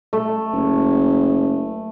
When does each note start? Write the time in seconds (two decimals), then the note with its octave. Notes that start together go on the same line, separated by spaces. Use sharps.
0.13 A3
0.53 F#1